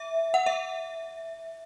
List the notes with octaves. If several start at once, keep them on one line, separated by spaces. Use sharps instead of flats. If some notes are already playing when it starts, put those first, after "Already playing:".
Already playing: E5
F#5
E5